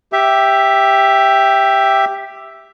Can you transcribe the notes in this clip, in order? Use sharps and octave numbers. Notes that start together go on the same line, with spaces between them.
G4 E5